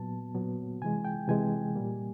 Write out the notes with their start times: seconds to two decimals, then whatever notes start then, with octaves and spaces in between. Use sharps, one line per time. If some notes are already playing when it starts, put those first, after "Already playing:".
Already playing: A#2 F#3 B3 A5
0.34 A#2 F#3 B3
0.81 C3 E3 G#3 G#5
1.05 G5
1.28 C3 E3 G#3 G#5
1.75 A#2 G3 A#3